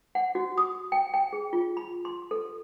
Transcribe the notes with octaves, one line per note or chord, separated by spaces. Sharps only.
F#5
F#4
D#6
G5
G5
G#4
F4
B5
C6
A4